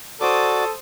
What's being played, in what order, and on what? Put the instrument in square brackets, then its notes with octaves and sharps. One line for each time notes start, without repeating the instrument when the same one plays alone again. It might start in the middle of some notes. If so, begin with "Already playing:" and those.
[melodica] F#4 D5 D6 [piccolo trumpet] A4 [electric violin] C5 D#6